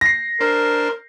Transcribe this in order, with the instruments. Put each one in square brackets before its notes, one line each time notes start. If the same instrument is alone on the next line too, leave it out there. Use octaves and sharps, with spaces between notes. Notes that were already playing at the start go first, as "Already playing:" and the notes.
[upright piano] A#6 C7
[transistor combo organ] D4 C5 [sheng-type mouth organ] A#4